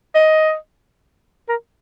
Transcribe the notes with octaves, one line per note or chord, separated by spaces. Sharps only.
D#5
A#4